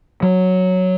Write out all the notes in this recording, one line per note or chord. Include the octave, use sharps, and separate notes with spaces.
F#3